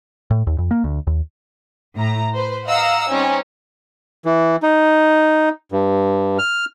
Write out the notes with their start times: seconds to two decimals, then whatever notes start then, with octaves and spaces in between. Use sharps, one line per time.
0.31 A2
0.47 D#2
0.58 F2
0.71 A#3
0.84 D2
1.07 D#2
1.97 A2 A#5
2.34 B4 C5
2.66 D#5 F5 F#5 A#5 E6
3.09 G3 C4 C#4 D#4
4.25 E3
4.63 D#4
5.72 G2
6.38 F6